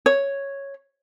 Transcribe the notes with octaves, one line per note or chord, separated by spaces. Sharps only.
C#5